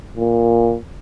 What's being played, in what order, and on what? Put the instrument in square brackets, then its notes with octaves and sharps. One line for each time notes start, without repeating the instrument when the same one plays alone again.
[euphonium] A#2